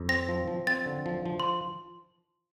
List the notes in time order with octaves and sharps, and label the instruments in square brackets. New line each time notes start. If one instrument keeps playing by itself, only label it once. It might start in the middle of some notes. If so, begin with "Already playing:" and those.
Already playing: [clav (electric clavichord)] F2
[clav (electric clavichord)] C4 [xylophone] A#6
[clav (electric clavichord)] F3
F3
[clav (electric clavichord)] C4 [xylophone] A6
[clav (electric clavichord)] D3
F3
F3
[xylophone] C6